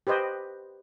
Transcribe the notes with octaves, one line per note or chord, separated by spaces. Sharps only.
G4 B4 C5 D#5